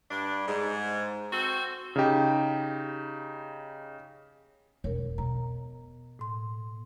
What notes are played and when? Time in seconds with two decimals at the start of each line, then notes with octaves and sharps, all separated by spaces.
0.10 G2 D4
0.47 G#2
1.32 C4 F#4 A4 C5
1.96 C#3 D#4 G4
4.84 E1 A#4 C#5
5.18 B2 A#5
6.19 A2 C6